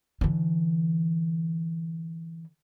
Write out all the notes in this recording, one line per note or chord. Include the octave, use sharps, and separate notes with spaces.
D3 E3